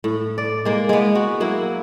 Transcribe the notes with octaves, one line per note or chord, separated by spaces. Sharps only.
A2
D5
G#3 A#3
G#3 B3
F#4
F#3 A#3 E4